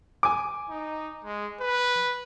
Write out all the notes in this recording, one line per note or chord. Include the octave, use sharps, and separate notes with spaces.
G#5 D6
D#4
G#3
B4